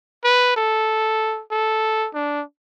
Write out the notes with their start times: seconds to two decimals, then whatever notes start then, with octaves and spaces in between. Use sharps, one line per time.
0.24 B4
0.56 A4
1.51 A4
2.14 D4